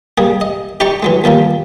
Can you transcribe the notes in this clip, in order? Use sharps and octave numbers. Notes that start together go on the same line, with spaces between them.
G3 A#3 G#4
D#5
D#4 G4 D5 D#5 A#5 C#6
E3 F#3 G#3
D#2 F3 G3 A#3